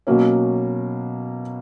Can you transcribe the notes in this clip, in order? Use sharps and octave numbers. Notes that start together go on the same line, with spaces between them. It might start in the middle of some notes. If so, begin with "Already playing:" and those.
B2 F#3 A#3 C#4